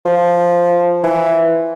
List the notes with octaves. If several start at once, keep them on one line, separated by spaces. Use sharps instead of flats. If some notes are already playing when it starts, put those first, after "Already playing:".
F3
E3